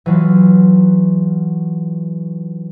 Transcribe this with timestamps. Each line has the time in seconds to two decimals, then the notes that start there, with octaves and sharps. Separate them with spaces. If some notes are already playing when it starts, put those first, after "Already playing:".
0.06 E3 F#3 F4